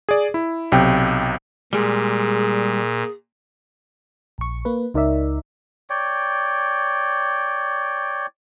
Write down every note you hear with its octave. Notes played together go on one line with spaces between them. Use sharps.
G#4 D5
E4
B1 C3 G5
A#2 G3 G#3 G#4
A#1 C#6
A#3 B4
C#2 D#4 A#4 D5 E5
C#5 D5 G5